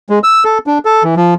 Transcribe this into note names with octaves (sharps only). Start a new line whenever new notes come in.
G#3
E6
A4
D4
A4
E3
F3